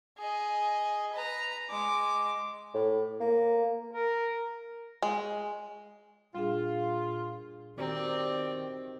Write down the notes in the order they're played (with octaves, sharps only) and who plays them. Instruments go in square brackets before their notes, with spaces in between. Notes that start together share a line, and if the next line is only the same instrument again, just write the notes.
[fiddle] G#4 D#5
B4 A#5
G#3 D6
[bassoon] A2
A#3
[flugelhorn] A#4
[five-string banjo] G#3
[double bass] A#2 [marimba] G3 D4 G#4 [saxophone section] F4
[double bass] D#3 [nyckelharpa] C4 [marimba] F#4 G4 A#5 [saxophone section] D5